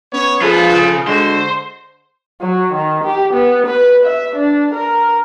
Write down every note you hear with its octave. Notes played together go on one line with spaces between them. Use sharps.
B3 C#4 C#5
F3 F4 G#4 A4 B4
C#3
D3 G#3 F#4 C5
F#3
D#3
G4
B3
B4
E5
D4
A#4